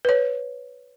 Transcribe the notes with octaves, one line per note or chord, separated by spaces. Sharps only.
B4 C#5